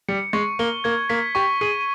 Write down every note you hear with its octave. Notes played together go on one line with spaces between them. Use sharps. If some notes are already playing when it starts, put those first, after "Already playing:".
G3 C#7
G#3 C#6
A#3 G7
A#3 G#6
A#3 B6
G4 C#6
G#4 D#7